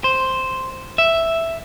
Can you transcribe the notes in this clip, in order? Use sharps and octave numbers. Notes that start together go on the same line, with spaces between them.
C5
E5